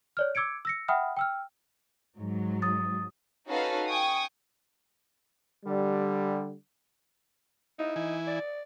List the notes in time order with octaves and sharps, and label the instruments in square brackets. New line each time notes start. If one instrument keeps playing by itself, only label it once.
[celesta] C#5 D5 F6
D6 E6 G#6 C#7 D7
E6 A#6 C#7
E5 F#5 G5 B5 D#6 F6
G5 E6 F6
[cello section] G#2 F#3
[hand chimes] D#6 A6
[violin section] C#4 D#4 F#4 A4 B4 F5
G5 G#5 C#6 D#6
[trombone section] D3 G3
[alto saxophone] D#4 [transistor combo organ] E4
[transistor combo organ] E3 E4 G#5
[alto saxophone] D5